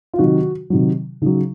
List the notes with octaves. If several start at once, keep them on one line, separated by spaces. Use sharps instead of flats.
F4
C3 D#3 F#3 F#4
C3 D#3 F#3
C#3 F#3 D#4